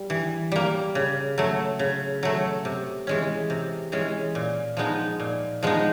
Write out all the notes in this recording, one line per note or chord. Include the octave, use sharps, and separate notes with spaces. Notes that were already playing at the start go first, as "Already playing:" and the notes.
Already playing: G3
E3
G3 A#3
C#3
F#3 A3
C#3
F#3 A3
C3
E3 G#3 C#4
C3
E3 G#3 C#4
A#2
F3 G#3 B3 D#4
A#2
F3 G#3 B3 D#4